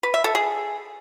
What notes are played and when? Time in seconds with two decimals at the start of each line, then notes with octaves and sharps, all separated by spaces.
0.03 B4
0.14 E5
0.24 A4
0.35 G#4